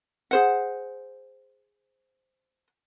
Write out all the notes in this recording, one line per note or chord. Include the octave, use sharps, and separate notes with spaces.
G#4 C5 F#5